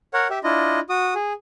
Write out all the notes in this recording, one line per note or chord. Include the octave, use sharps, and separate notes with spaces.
A#4 C#5 F#5
G4 E5
D4 E4 F4 D#5
F#4 D#6
G#4